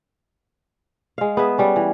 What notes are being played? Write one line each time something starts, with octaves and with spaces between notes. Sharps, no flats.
G#3 F5
B3 G#4 E5
G3 C#4 A4
E3